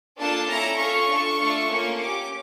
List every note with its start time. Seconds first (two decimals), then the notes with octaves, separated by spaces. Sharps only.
0.18 A#3 D4 F4 A4 A5
0.49 C#4 E4 A4 A#5
0.79 C#4 F4 A4 C#6
1.09 D4 F4 A4
1.39 A3 D4 F4 A4
1.70 A#3 C#4 F4 A4
1.99 C#4 G4 D6